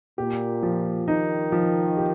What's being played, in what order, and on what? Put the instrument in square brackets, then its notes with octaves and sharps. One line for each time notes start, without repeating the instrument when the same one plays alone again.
[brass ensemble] A#2 [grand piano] G4
[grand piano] F3
[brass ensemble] D#3 [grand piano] D#4
[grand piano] F3
G4